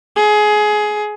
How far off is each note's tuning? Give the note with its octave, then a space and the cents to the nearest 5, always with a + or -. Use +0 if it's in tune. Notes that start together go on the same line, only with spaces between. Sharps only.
G#4 +20